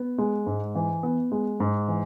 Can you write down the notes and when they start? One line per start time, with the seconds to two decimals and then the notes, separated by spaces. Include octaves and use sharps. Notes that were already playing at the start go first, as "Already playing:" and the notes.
Already playing: B3
0.18 G#3
0.46 G#2
0.75 E3
1.03 B3
1.32 G#3
1.60 G#2
1.88 E3